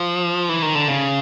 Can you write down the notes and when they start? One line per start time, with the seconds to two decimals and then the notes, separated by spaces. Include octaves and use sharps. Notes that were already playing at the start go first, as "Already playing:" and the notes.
Already playing: F3
0.49 E3
0.62 D#3
0.75 D3
0.88 C#3